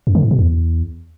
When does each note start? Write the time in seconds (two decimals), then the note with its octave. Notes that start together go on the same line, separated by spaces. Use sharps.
0.07 F#2
0.15 D3
0.23 G#2
0.31 B2
0.39 E2